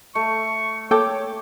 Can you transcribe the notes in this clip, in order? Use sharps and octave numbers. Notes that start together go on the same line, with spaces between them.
A3 C#6
A#3 A4 C#5 G5 D6